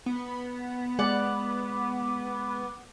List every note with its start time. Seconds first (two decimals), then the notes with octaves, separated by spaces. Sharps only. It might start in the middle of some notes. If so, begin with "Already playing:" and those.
0.06 B3
0.99 G#3 D5 F#5 D6